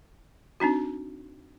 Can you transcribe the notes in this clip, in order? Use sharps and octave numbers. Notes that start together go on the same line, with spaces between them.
C4 D4 D#4 F#4